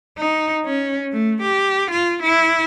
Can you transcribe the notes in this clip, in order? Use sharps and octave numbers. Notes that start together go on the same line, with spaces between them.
D#4
C#4
A3
G4
F4
E4